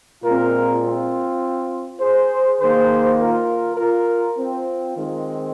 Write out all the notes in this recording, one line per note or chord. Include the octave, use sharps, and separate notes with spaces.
A#2 G#3 C4 F4 A#4
C4 F4
G#4 C5
D#3 A#3 G#4 C5
F4 A#4
F4 A#4
C4 F4
D#3 G#3 C4